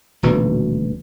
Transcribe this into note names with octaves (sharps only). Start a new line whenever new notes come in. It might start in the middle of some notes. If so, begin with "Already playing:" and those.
D#1 D2 B2 E3